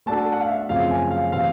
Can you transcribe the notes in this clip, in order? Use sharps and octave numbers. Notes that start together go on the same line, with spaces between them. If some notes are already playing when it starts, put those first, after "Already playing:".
A3 D4 F#4 A4 A5
F#5
F5
E5
F#2 C#3 F3 A3 C4 F5
G#5
F5
C3 E3 A3 C4 F5